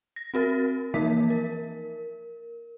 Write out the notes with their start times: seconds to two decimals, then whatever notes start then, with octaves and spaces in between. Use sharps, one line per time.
0.16 A#6
0.34 C4 F#4 A#4 A6
0.94 E3 F3 A#3 D#4 E5 B6
1.30 A#4